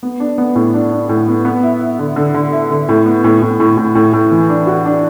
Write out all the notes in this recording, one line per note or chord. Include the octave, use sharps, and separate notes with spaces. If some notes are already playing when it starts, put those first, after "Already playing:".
B3
D4
B3
A2
D4
D4
A2
B3
B3
E4
E4
D3
D3
D3
E4
D3
A2
B3
A2
A2
A2
A2
A2
A2
E3
D4
F#4
D4